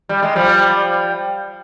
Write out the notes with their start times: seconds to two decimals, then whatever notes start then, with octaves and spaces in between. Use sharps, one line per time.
0.09 G3
0.22 G#3
0.36 F3 G3